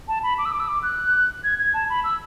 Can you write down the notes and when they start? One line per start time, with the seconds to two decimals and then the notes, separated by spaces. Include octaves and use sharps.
0.08 A5
0.23 B5
0.38 D6
0.45 E6
0.52 D6
0.60 E6
0.68 D6
0.83 F#6
1.44 G#6
1.59 G#6
1.74 A5
1.90 B5
2.04 E6